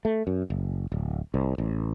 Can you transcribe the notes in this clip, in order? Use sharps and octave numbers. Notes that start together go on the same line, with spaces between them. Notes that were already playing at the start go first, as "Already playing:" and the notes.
A3
F#2
F#1
D1
C2
A1